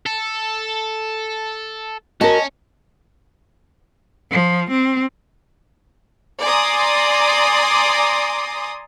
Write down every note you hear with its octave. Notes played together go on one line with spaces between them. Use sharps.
A4
C#4 F#4 A#4 D#5 A5
F3
C4
D5 G#5 A#5 C6 D6 D#6